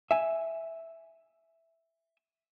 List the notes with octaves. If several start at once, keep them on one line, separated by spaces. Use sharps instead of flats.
E5 G#5